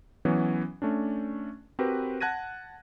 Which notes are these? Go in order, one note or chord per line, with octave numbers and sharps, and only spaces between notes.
E3 F#3 B3 C#4 F#4
A3 C#4 D4
C4 F#4 G4 A#4 B4
F#5 A5 F#6 G#6 A#6 D#7